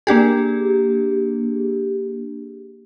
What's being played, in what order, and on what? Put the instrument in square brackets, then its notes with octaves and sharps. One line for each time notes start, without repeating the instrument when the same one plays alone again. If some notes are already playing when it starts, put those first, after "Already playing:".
[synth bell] A#3 D4 G4 G#4